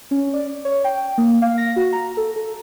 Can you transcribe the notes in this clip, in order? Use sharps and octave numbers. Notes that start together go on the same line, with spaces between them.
C#4
D5
C#5
G5
A#3
F5
A#6
F#4
A#5
A4
A4